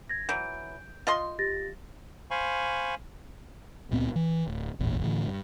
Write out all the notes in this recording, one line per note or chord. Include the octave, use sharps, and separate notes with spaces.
G#6 A#6
E3 F#3 G6 D7
F4 D#5 C6
G4 A6 A#6
C5 F5 G#5 B5 C#6
C#2 A#2 B3 C4
E3
D1
D1 G#1 E2 A#2
A2 D3 E3
G2